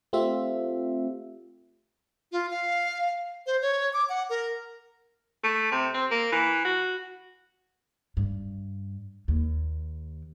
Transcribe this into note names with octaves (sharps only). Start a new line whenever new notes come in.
A3 C4 F4 G4 E5
F4
F5
C5
C#5
D6
F#5
A#4
A3
C3
C4
A#3
E3
F#4
G2
D#2